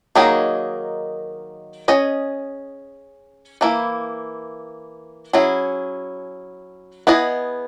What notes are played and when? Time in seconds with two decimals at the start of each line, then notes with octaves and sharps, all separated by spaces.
0.15 D#3 F#3 A#3 D#4 G#4
1.88 C#4 G#4 D#5
3.61 E3 A#3 E4
5.33 F#3 C#4 E4 G#4
7.07 B3 E4 G#4 D#5